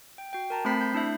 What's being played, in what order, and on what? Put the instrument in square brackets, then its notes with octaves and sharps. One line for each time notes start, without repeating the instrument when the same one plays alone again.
[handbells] G5
F#4 G5
A#4 A5 A#5
A3 C4 C5 B5 B6 C7
G6
A3 D4 E4 E5